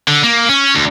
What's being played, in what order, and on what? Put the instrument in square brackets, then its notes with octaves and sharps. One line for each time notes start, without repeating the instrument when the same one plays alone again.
[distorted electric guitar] D3
A#3
C#4
D2